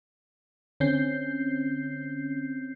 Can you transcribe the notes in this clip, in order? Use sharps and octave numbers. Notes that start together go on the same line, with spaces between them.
D3 C4 C#4 G6 C7